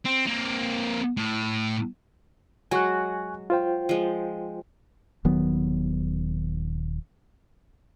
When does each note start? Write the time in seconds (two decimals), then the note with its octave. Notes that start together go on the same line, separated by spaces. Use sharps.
0.05 C4
0.27 A#3 C4
1.17 A2
2.71 F#3 G#3 F#4 G#5 C#6 F#6
3.50 F4 C5 G5
3.89 F3 G#3
5.25 D#1 D#3 F#3 B3